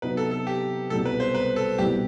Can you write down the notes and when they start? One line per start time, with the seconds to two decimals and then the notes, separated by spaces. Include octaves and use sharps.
0.02 C3 F#3 B3 D#4 B4
0.17 A4
0.31 A4
0.47 G4
0.90 C2 B2 G3 B3 A4
1.05 B4
1.20 C5
1.34 B4
1.56 A4
1.78 C2 B2 G3 B3 E4 G4